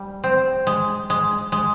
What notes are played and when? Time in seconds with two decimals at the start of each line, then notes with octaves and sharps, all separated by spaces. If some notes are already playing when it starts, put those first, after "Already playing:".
Already playing: G3
0.24 C4
0.67 G#3
1.10 G#3
1.52 G#3